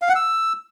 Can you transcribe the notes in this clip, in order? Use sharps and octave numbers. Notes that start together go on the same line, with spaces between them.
F5
F#5
E6